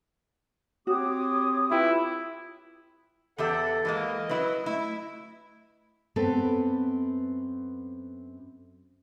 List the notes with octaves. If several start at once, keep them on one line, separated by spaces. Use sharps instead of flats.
C4 F#4 G4 C#5 D6 D#6
E4 F4 B4 G5
E2 G4 A4 E5 F#5
E3 G#3 A#3 D#5
F#3 E4 B4
A3 E4
F#2 B3 C4 A4 B4